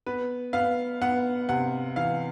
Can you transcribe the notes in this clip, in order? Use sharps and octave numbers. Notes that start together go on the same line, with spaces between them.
B3 B4
B3 F5
B3 F#5
C3 F#5
E3 F5